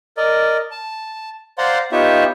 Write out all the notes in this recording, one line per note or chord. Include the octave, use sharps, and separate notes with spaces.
A#4 D5 D#5
A5
C5 D5 F5 F#5 A#5 C6
B3 D#4 F4 G4 C#5 E5